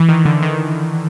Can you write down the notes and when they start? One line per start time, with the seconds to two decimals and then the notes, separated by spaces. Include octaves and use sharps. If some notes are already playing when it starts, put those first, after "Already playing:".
Already playing: E3
0.09 D#3
0.25 D3
0.42 D#3